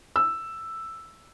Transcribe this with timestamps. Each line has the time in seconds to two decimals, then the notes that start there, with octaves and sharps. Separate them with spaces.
0.16 E6